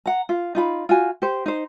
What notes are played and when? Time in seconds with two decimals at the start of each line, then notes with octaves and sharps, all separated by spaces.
0.06 F#5 A#5
0.29 F4
0.55 D#4 F4 B5
0.89 F4 F#4 G#5
1.22 G4 C5
1.46 D#4 C5